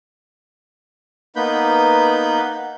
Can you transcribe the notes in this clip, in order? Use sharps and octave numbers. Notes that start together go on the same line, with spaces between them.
A#3 B3 D#4 B4 B5 G6